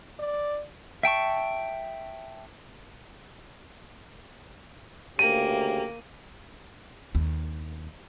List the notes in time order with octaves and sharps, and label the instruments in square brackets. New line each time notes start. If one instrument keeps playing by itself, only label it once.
[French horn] D5
[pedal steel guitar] E5 G5 A5 C#6
[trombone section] D2 C#3 G4 [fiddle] A#3 [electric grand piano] D#7
[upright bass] D#2